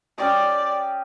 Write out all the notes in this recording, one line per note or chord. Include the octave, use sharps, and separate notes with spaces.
C#4 G4 D5 D#5